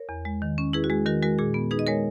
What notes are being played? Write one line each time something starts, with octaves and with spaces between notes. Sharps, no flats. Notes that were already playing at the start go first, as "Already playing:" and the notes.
Already playing: A#4 C#5
E2
G#3
D#3
C#4
E4 G#4 B4
F#4
G#3 G#4
D#3 F#4 A#4
G#3 F#4 A#4
A#2 G#4
B3
D#4 G#4 B4
D#5
G#3 A#4 C#5